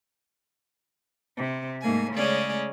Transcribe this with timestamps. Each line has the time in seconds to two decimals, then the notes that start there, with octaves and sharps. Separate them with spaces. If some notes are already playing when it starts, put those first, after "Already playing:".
1.37 C3
1.82 G#2 A3 A#3 G#5
2.14 C#3 G#3 A3 C#4 G#4 D5